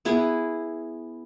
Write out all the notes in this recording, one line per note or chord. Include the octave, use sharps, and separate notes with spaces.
B3 E4 G#4